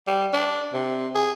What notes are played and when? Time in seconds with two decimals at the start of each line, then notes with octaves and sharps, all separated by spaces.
0.07 G3
0.33 D4
0.73 C3
1.15 G#4